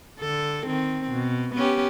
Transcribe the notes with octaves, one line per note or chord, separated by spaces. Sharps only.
D3 A4
D#3 C4
B2
B3 C#4 G4